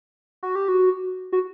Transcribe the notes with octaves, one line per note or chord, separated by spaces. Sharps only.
F#4
G4
F#4
F#4